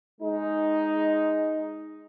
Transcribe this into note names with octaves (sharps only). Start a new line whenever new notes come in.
G#3 D#4